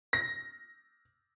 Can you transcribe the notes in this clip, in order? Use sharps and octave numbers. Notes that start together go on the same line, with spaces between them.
A#6